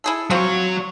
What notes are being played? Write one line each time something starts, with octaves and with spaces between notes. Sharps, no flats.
E4 G#4 A4
F#3 C4 F4 C#5